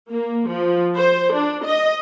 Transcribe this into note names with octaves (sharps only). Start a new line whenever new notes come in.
A#3
F3
C5
D4
D#5